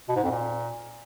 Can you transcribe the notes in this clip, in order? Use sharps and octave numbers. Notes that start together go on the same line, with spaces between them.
B2
G#2
F2
A#2